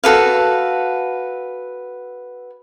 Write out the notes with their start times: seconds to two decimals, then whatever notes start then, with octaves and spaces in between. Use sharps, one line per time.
0.04 F#4 A4 B4 F5